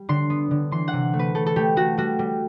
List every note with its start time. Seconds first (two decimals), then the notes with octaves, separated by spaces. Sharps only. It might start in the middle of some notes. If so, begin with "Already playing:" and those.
Already playing: G3
0.09 D3 C6
0.30 B3
0.51 D3
0.71 E3 C6
0.88 F#5
0.93 C3
1.13 A3
1.19 B4
1.35 A3 A4
1.46 A4
1.56 A3 G4
1.77 A3 F#4
1.98 G3 F#4
2.19 G3